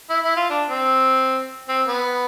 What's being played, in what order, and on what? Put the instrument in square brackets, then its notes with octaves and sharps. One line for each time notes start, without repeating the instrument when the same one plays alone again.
[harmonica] E4
E4
F4
D4
C4
C4
B3